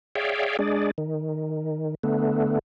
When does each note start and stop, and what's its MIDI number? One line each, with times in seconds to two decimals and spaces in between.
0.15 0.57 68
0.15 0.57 73
0.15 0.57 74
0.15 0.57 76
0.15 0.57 77
0.15 0.57 79
0.59 0.91 56
0.59 0.91 62
0.59 0.91 68
0.59 0.91 74
0.98 1.95 51
2.03 2.59 50
2.03 2.59 57
2.03 2.59 59